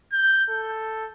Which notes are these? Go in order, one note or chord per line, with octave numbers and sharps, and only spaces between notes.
G6
A4